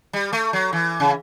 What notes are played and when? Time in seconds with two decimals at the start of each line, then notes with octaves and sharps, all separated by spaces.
0.13 G3
0.33 A3
0.53 F#3
0.73 E3
1.00 C#3